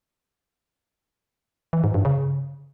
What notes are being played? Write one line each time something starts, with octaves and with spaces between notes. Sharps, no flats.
E3
G#2
G2
C#3